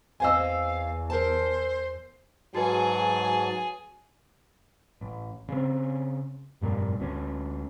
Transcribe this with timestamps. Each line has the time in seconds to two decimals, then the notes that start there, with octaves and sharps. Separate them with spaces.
0.20 E2 C4 C5 D#5 F5 G#5 E6
1.10 A#4 C5 A5
2.55 G#2 F#3 F#4 G#4 B4 G#5 A5
5.01 A1
5.48 C#3 C4
6.61 F1 G2 A#2
7.00 D2 C#4